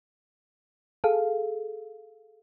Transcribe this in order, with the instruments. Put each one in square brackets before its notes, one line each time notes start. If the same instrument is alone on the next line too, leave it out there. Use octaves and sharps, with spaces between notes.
[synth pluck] G#4 A4 F5